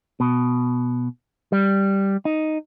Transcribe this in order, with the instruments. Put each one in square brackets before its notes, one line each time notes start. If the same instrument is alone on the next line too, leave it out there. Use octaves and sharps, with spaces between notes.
[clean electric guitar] B2
G3
D#4